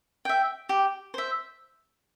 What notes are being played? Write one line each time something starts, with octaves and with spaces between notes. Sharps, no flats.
E5 G5
G4
C5 E5